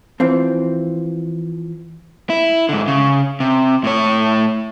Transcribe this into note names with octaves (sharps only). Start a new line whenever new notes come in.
E3 F3 C4
E4
G#2 D3
C#3
C3
A2 C#5